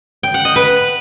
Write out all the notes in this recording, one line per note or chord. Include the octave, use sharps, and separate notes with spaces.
G5
F#5
D#5
B4